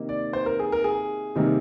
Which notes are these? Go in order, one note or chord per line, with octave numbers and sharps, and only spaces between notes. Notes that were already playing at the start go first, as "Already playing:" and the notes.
Already playing: C3 D#3 A#3
D5
C5
A#4
G#4
A#4
G#4
C3 D#3 G3 A#3